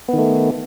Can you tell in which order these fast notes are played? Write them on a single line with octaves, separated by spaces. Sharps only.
B3 D#3 A3